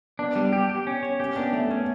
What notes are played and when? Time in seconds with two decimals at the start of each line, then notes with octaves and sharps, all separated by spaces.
0.19 B3 D4
0.36 G3 B3
0.53 B3 G4
0.70 G4
0.87 C#4
1.03 C#5
1.20 C#4 G4
1.36 B3 D4
1.53 A3 B3
1.70 B3 C#4